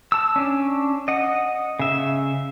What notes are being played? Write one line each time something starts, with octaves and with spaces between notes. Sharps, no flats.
A5 E6
C#4 D4
D#5 F#5
C#3 E5